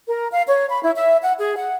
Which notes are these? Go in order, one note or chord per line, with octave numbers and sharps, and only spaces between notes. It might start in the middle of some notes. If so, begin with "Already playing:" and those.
A#4
F5
C#5
B5
E4
E5
F#5
G#4
F#5